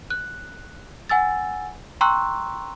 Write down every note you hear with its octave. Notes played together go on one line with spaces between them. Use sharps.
F#6
F#5 G#5 E6 A6
G5 A#5 C6 C#6 E6 F#6